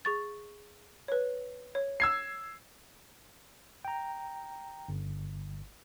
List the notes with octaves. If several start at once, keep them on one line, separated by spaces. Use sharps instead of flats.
G#4 C#6 A6
B4 C#5
C#5
E6 G#6 C7
G5 A#5
G1